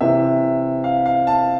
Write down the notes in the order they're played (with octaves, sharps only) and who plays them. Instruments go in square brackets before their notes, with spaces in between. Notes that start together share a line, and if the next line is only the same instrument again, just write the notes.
[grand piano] C3 E3 E5
F5
F5
A5